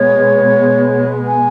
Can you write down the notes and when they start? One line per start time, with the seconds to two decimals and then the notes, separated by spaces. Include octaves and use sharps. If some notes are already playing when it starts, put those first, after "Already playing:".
Already playing: B2 G#3 B3 C#5
1.27 G#5